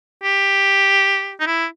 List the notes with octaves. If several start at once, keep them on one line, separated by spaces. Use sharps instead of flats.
G4
D#4
E4